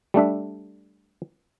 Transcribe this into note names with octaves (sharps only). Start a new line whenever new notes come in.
G3 A3 D4 E5